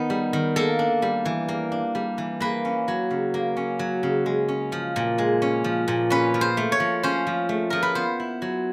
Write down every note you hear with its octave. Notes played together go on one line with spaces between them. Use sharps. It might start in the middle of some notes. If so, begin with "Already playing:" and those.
Already playing: D#3 B3 D#4
G3
D#3
A#3 A4
D4
G3
E3
A#3
D4
G3
E3
A#3 B4
C#4
F#3
C#3
A#3
C#4
F#3
C#3
G#3
C#4
F3
A#2
G#3
C#4
F3
A#2
C#4 B4
F3
C5
A3
C#5
F3
C#4 C5
F3
A3
F3 A#4
B4
B3 C5
E4
F#3